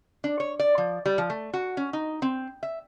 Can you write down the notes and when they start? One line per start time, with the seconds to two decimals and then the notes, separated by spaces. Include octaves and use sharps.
0.24 D4
0.40 C#5
0.60 D5
0.78 F3
1.06 G3
1.18 F3
1.30 A3
1.53 F#4
1.77 C#4
1.93 D#4
2.22 C4
2.63 E5